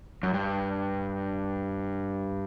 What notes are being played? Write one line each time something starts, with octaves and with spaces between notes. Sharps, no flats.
F#2
G2